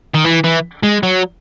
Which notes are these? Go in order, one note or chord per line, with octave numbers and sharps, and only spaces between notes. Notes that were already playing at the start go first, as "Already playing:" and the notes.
D#3
E3
E3
G#3
F#3